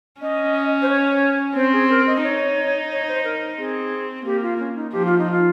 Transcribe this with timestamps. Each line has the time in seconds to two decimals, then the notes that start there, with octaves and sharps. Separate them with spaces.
0.21 C#4 D#5
0.82 C5
0.89 C#5
1.56 C4 C5
1.73 G#4
1.90 A#4
2.07 D#5
2.23 D#4 C#5
2.91 C#5
3.08 C5
3.24 A#4
3.58 C4 G#4
4.25 A#3 G4
4.42 F4
4.59 C#4
4.76 D#4
4.93 F3 G4
5.05 F4
5.18 D#4
5.31 F4